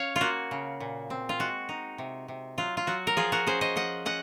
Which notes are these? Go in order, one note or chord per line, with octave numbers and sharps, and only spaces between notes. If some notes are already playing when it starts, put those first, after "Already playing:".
Already playing: C#4 C#5 F5
F4
A#3 F#4
C#3
A#2
C4
F4
G#3 F#4
D#4
C3
C3
F#3 F4
F4
F#3 F#4
A#4
F3 F4 G#4
F#4 A#4
C#4 G#4 C5
C5 D#5
F3 D#5 F#5
C#4 D#5 F#5